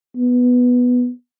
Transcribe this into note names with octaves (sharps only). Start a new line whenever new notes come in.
B3